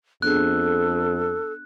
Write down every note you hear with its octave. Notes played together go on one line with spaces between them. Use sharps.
F2 B3 D4 G#4 A4 F#6